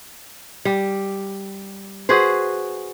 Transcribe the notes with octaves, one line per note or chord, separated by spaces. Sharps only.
G3
F#4 G#4 B4 C5